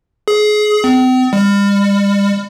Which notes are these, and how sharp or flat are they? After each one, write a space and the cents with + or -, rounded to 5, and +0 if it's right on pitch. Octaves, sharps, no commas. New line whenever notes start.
G#4 +25
C4 -40
G3 +40